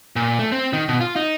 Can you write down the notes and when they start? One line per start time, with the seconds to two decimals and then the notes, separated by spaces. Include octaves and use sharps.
0.16 A#2
0.39 A3
0.52 C4
0.73 D#3
0.88 B2
1.01 F4
1.16 D#4